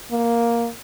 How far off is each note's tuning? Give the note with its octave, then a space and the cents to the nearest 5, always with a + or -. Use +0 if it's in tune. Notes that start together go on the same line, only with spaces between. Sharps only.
A#3 +5